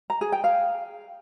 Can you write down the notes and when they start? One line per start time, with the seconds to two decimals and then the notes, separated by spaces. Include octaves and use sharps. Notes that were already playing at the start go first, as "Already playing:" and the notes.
0.10 A#5
0.21 G#4
0.32 G5
0.44 F5